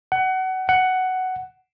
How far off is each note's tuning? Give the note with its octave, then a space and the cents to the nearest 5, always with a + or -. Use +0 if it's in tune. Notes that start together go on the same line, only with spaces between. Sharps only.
F#5 +25
F#5 +10